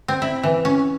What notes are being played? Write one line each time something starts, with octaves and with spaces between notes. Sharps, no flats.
C4
E4
E3
C#4